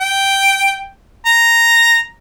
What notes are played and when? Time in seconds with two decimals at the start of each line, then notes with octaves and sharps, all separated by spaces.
0.01 G5
1.26 A#5